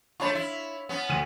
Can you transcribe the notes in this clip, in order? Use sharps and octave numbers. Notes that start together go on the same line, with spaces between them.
A3 D4 F4 C#5 B5 C#6
E4
B3 C#4
D2 D#7